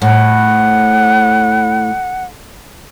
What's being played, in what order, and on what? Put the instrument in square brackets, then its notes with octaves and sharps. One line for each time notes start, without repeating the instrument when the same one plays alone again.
[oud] A2 [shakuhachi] F#5